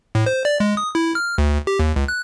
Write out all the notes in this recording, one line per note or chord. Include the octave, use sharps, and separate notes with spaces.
A2
C5
D5
G#3
D#6
E4
F6
D2
G4
D#2
C#2
F#6